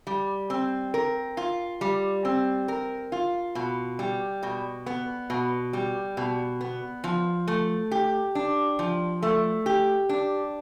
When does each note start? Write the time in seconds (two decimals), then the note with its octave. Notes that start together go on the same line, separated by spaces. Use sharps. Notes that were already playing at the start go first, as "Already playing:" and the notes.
0.07 G3
0.50 C4
0.94 A#4
1.37 F4
1.81 G3
2.25 C4
2.68 A#4
3.12 F4
3.55 B2
3.99 G3
4.43 B2
4.86 B3
5.30 B2
5.73 G3
6.17 B2
6.61 B3
7.04 F3
7.48 A3
7.91 G4
8.35 D4
8.79 F3
9.22 A3
9.66 G4
10.09 D4